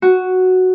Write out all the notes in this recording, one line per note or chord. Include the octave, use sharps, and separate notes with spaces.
F#4